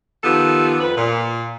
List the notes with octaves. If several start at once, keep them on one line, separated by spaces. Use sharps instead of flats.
D#3 F3 B3 G4 A4
F2 B4
A#2